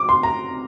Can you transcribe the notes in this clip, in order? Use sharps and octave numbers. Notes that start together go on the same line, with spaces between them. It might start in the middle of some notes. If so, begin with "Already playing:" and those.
Already playing: D6
C6
A#5